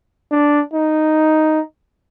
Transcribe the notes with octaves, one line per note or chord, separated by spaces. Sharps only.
D4
D#4